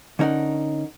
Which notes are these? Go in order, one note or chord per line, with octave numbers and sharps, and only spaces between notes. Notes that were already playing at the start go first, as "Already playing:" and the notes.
D3 C#4 D#4 A#4 F#5